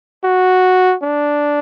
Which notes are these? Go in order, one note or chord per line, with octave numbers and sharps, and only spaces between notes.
F#4
D4